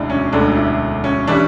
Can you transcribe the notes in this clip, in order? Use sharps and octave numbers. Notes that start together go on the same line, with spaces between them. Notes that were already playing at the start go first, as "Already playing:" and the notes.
Already playing: E1 D2 D4 E4
C#4
E1 D2 D3 D4
E4
C#4
E3 G3 C#4 D4